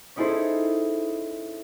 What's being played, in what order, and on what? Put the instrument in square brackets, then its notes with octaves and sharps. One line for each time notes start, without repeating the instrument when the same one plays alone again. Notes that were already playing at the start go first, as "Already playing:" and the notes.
[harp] C#4 D#4 E4 G#4 A4 C5